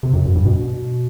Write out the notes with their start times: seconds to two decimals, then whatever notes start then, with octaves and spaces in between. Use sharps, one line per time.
0.03 C3
0.14 F#2
0.25 F#2
0.36 G2
0.46 B2